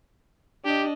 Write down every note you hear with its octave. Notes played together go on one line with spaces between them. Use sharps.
D4 G4 D#5